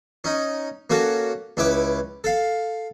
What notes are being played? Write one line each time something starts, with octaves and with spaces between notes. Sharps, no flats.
C#4 D#4
A#3 C#4 F#4 A4
C#2 C#4 E4 B4 D6
A4 F5